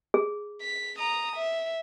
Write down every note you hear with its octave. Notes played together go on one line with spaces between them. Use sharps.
G#4
B6
A#5 D#6
E5